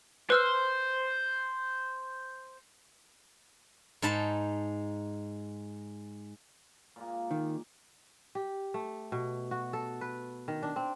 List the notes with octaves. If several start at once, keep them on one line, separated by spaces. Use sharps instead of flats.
B4 C5 E6 F6
G#2 D#4 A5 B5
A#2 G#3 A#3
D#3
G4
A3
B2
F#4
A4
B4
D#3
D4
C4